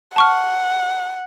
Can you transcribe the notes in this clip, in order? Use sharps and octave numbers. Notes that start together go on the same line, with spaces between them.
F#5 A5 C#6 F6